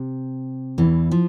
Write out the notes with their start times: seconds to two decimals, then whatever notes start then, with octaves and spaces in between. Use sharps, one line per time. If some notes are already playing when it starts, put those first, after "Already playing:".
Already playing: C3
0.78 E2 E3
1.11 F3